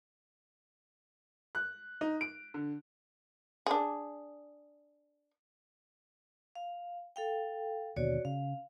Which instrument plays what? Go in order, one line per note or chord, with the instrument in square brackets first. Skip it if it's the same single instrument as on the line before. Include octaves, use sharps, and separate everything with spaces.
[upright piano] F#6
D#4
D7
D3
[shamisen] D4 G#4
[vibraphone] F5
A4 F5 G5
[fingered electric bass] D#2 B2 D3 [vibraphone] F#4 C#5 D5
[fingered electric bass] C#3 [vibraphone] F5